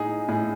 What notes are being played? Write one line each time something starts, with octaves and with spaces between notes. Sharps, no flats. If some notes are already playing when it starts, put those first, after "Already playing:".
Already playing: A2 D#4 G#4
A2 G#4